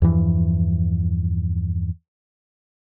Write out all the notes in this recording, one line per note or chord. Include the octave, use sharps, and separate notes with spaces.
E2 G2 E3 F3